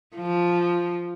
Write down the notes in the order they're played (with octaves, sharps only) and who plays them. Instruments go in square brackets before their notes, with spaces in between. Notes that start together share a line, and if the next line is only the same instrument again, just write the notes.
[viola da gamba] F3